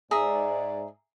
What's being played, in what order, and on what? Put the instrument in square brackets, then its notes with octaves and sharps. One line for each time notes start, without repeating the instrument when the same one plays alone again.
[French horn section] G#2 D5 [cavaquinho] G#4 E5 A#5